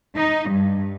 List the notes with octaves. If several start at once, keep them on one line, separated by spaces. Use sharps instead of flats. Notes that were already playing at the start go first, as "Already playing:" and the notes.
D#4
G2